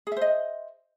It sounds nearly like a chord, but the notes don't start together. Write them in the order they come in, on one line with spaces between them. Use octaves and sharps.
G#4 E5 C5 D#5